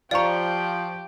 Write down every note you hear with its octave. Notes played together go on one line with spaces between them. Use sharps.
F3 G4 D5 F5 A#5 C#6